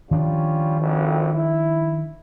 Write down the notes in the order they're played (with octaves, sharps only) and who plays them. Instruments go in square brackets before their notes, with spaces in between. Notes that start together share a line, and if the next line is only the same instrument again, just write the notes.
[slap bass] D#3 F3 D4 [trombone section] G3 C#4 F4
[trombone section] G#1 F2
E4